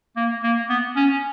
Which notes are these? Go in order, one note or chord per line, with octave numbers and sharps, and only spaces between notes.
A#3
A#3
B3
C#4